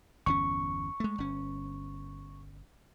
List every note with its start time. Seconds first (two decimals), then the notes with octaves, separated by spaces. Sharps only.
0.26 G1 E2 C#4 C#6
1.00 G#3 A3
1.18 G1 C#4